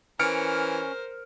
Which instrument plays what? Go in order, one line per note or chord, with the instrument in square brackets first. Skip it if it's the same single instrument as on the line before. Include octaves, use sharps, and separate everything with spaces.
[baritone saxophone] E3 [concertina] C#4 [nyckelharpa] A#4 C5 [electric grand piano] F6 C#7 D7